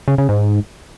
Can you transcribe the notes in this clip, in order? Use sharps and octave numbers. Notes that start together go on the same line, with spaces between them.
C#3
C#3
G#2